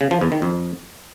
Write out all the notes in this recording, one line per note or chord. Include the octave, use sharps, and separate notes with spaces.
C#3
F3
E2
D#3
F2